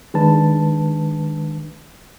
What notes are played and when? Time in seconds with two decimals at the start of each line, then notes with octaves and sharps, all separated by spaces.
0.14 D#3 G#3 D4 B4 A5